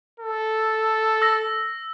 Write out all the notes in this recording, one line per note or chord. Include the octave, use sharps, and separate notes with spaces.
A4
E6 A#6